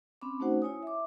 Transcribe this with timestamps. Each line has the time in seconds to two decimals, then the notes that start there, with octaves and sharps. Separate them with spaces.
0.22 C4 C#4 B5 D6
0.40 A3 C#4 D#4 F#4 C5 F#5
0.62 E4 C#5 G#5 D#6
0.83 E5 D6